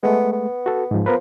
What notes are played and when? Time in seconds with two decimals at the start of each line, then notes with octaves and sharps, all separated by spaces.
0.03 G#3 A3 B3
0.32 B3
0.66 F#4 A4
0.91 G#2 F3
1.06 F3 B3 A#4 B4